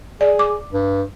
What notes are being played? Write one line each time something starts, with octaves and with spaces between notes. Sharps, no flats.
G#4 D5
D6
G2